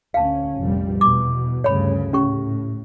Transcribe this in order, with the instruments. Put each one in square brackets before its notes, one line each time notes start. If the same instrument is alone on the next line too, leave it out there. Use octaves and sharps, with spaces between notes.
[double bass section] D2 C#4 [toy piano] F5 A5
[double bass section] F1 A#1 G3
[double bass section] E2 B2 [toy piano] D6
[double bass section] D2 G2 C#3 [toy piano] C#5 B5
[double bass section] A2 [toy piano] C#4 G4 C#6